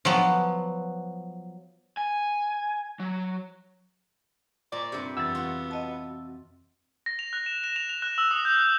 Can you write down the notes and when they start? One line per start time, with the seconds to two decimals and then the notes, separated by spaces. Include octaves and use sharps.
0.05 F3 F#3 B3
1.97 G#5
3.00 F#3
4.72 A#2 D5
4.92 G2 C3
5.17 F2 E3 B3 E6 A6
5.35 F4 F#4
5.71 D#5 A5
7.06 A#6
7.19 F7
7.33 F#6
7.46 E7
7.64 E7
7.76 F7
7.89 F7
8.02 F#6
8.18 E6
8.31 D#6
8.45 G6
8.57 F#6